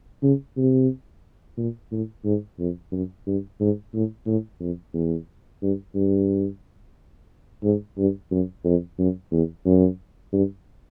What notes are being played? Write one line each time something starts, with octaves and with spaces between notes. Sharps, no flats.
C#3
C3
A#2
A2
G#2
F2
F#2
G2
G#2
A2
A2
F2
E2
G2
G2
G#2
G2
F#2
F2
F#2
E2
F#2
G2